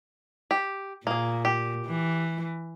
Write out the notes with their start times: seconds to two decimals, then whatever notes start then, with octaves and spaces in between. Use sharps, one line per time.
0.51 G4
1.07 A#2 A#3 G#4
1.45 G4
1.86 E3